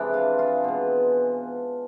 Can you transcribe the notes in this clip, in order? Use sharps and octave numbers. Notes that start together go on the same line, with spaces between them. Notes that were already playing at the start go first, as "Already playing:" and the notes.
Already playing: C3 E3 G#3 D4 D5
F4 F5
F4 F5
B2 G#3